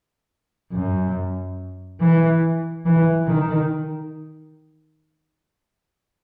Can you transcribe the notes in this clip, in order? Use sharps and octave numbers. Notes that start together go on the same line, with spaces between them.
F#2
E3
E3
D#3